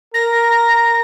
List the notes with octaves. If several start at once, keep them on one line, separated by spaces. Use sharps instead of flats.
A#4 A#6